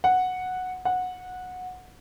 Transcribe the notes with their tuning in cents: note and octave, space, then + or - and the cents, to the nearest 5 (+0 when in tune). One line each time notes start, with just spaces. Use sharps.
F#5 -5
F#5 -15